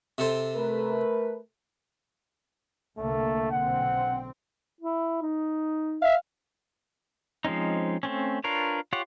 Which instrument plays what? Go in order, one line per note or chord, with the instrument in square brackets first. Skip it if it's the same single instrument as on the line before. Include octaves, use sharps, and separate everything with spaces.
[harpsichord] C3 A4 C5
[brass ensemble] A3 A#4 B4
[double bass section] C2 D3 A#3 [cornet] A3
[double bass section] B1 D3 C4 [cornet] F#5
[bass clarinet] E4
D#4
[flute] E5 [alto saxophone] F5
[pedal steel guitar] F3 G#3 C4 C#4 D#4
A3 C4 C#4
D4 F4 A#4 B4 C#5
F4 G4 C#5 F#5